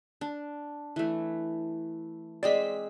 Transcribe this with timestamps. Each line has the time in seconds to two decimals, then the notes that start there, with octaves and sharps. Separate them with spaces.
0.21 D4
0.96 E3 A3
2.43 G#3 C4 C5 D5 D#5 B6